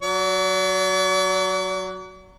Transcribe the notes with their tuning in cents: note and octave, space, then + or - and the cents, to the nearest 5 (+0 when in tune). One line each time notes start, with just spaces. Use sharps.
F#3 +0 D5 -45